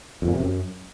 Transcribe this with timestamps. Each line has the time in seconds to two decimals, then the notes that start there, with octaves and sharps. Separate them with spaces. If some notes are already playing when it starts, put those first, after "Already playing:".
0.22 F2
0.28 A#2
0.34 C3
0.39 F#2